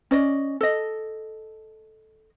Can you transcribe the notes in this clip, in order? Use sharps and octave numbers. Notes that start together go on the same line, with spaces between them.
C#4 D5 D#5
A4 D#5